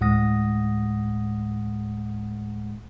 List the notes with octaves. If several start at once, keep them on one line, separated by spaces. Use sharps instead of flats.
D2 A2 G#3 F#5 D#6 A#6